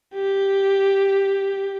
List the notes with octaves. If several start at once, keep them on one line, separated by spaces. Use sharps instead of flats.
G4